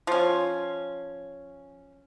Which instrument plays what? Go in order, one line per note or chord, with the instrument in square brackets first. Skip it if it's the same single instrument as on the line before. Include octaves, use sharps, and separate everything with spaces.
[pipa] F3 C#4